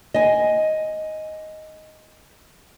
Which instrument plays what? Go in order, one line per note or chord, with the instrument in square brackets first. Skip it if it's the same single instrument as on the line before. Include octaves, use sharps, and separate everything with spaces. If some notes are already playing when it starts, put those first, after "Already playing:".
[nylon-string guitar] D#5 G#5